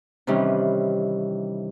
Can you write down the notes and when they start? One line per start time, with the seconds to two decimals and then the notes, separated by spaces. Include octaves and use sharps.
0.27 C3 D#3 E3 G3 C#4